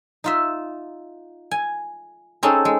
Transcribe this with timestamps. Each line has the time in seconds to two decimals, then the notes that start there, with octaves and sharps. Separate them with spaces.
0.24 D#4 F4 E5
1.51 G#5
2.43 C4 C#4 D#4 G#4 A4
2.65 G#3